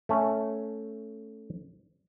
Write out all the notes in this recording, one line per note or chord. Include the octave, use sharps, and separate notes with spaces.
A3 C#4